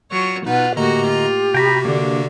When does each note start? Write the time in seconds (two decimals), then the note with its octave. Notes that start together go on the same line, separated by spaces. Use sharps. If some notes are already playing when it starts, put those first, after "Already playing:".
0.12 F#3 F4 C#5
0.47 B2 D#4 F4 B4 F#5
0.77 A2 D3 A#3 F#4 G4 D#5 A#5
1.07 F4
1.54 C3 F#4 G5 A#5 B5
1.85 D3 A#3 D4